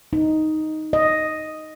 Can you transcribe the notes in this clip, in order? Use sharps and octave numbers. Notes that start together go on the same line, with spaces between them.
D#4
D#5